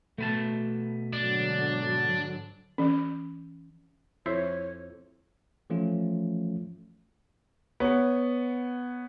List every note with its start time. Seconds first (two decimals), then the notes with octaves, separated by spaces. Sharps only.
0.18 B2 A3 B4 A5
1.13 G#2 D3 F#3 D4
2.78 E3 C#4
4.26 F2 E4 C5 C#5 E5
5.70 E3 F3 A3 C#4 F4
7.80 B3 C#5